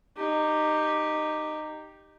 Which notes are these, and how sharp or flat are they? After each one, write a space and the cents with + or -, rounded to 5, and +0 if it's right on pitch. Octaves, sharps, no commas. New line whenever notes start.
D#4 -15 G4 +0